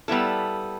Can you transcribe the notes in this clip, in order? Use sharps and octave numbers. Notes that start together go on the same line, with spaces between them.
G3 B3 E4 A4